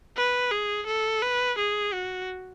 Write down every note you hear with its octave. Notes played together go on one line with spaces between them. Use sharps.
B4
G#4
A4
B4
G#4
F#4